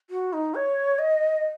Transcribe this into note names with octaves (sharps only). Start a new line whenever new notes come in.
F#4
D#4
C#5
D#5